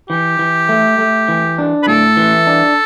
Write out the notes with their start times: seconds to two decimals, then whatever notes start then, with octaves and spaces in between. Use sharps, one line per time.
0.09 E3 G4
0.39 E3
0.69 A3
0.98 A3
1.29 E3
1.58 D4
1.83 B4
1.87 A2 A4
2.17 E3
2.47 D4